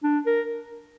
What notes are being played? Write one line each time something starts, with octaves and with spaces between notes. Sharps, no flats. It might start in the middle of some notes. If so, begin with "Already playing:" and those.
D4
A#4